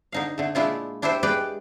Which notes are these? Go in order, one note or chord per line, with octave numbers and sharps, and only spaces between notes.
D3 D#4 F5
D3 A3
A#2 G#3 A3 D4 E4 F4
D4 E4 G4 A4 C5
G#3 G4 B4 D5 G5